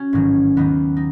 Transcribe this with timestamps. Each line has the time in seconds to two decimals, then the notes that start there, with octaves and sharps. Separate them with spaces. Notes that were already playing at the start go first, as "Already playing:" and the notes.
Already playing: C#4 F#4
0.13 A1 G#2 D#3 F#3
0.56 D#2 D#3 F#3 B3
0.97 D#4